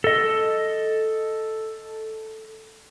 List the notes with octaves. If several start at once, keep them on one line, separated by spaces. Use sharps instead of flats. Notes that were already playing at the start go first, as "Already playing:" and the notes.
A4 D#5